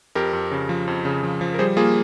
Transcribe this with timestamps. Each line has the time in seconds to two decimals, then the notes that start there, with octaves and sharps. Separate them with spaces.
0.15 F2 G4 A#4
0.33 F2
0.51 C#3
0.69 F3
0.88 F2
1.05 C#3
1.23 F3
1.41 F3
1.54 A#4
1.59 G3 G#4 C5
1.77 A#3 F4 G#4